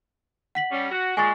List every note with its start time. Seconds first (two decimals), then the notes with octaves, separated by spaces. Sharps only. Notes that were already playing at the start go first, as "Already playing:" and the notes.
0.55 F#5 B6 F#7
0.71 G3 C#4
0.91 F#4
1.17 A#2 G#3 G#5 C#6 A6